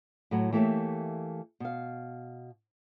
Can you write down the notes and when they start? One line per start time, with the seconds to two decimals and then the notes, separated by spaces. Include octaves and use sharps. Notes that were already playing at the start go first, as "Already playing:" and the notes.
0.31 A2 F#3
0.52 E3 A3 A#3 G4 C#5 E5
1.60 B2 F5